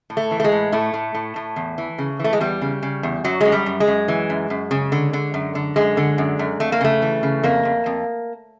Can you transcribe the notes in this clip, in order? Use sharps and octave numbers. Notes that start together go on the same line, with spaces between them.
A2
A3
E3
A3
G#3
A2
A2 A3
A2
A2
A2
E2
E3
C#3
E3 A3
G#3
E2 G3
C#3
C#3
E2
F#2 F#3
F#2 G#3
G3
F#2
G#3
F#2
E3
F#2
F#2
C#3
D3
D3
F#2
D3
F#2 G#3
D3
F#2
F#2
F2 A3
A#3
C#3 A3
E3
C#3
F2 A#3
F2
F2